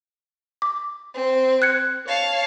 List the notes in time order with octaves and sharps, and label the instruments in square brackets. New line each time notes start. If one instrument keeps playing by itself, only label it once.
[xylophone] D6
[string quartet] C4
[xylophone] F#6 G#6 C#7
[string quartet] C#5 F5 A5